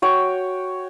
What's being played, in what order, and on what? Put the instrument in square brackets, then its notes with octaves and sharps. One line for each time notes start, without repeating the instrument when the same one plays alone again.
[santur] F#4 C#5 G5